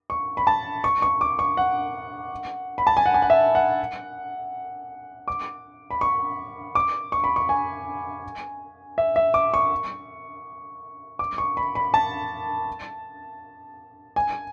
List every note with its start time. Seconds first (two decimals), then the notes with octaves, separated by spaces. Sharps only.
0.10 C#6
0.37 B5
0.47 A5
0.84 C#6
1.02 C#6
1.21 D6
1.39 C#6
1.57 F#5
2.78 B5
2.87 A5
2.97 G#5
3.06 F#5
3.14 G#5
3.22 F#5
3.30 E5
3.55 F#5
5.28 D6
5.91 B5
6.01 C#6
6.75 D6
7.12 C#6
7.24 B5
7.36 C#6
7.49 G#5
8.98 E5
9.16 E5
9.34 D6
9.54 C#6
11.19 D6
11.38 C#6
11.57 B5
11.75 B5
11.94 A5
14.16 G#5